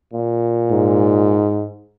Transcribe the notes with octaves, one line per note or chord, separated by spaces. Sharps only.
A#2
G#2